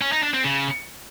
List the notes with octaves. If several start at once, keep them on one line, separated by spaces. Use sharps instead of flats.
C#4
D#4
D4
C4
C#3